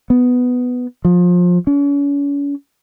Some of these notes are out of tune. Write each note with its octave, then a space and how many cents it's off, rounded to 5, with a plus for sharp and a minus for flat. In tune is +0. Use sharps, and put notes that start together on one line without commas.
B3 +5
F3 +25
C#4 +40